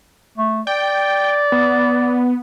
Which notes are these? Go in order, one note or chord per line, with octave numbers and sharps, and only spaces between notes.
A3
D5 G5
B3